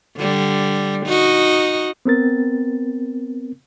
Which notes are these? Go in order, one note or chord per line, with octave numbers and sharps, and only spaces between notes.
D3 G3
D#4 F#4 D#5
B3 C4 A#4 A6